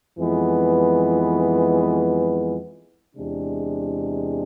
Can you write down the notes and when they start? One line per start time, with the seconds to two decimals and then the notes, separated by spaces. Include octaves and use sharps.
0.18 F2 E3 G#3 B3
3.16 E2 C3 G#3 D4